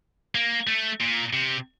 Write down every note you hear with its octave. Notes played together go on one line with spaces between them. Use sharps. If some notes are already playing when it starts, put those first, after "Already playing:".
A#3
A3
A#2
C3